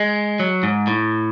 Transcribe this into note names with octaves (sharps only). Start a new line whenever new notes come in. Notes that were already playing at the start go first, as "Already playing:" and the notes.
Already playing: G#3
F#3
G#2
A2